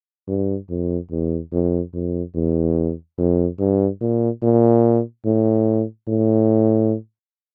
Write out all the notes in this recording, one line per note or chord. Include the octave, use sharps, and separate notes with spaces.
G2
F2
E2
F2
F2
E2
F2
G2
A#2
A#2
A2
A2